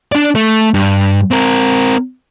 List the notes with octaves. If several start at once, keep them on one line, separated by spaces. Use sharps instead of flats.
D4 D5
A3
G2
C4 A#4